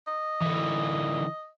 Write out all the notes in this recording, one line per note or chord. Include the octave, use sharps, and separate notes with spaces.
D#5
D3 E3